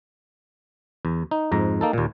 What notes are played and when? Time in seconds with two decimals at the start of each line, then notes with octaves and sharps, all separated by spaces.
1.05 E2
1.31 D#4
1.52 F2 G#2 A#5
1.81 A#3 D#4 A4
1.93 D#2 A#2